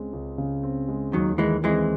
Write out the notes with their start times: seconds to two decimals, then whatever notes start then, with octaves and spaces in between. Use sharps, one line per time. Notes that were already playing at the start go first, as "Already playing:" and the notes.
Already playing: C#2 C#3 G#3 C4
0.13 C#2
0.38 C#3
0.63 C4
0.88 G#3
1.13 D#2 D#3 F#3
1.38 D#3 E3 G#3
1.64 E3 G#3 C4